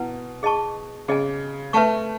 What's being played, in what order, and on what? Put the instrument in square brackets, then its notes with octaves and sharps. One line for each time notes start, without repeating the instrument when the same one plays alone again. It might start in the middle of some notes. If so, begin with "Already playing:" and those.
Already playing: [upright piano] B2 [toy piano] E4 B4 F#5
[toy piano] G#4 D#5 A5 C#6
[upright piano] C#3 [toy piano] G#4 D#5 G#5
[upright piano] A3 [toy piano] B4 E5 A5 C#6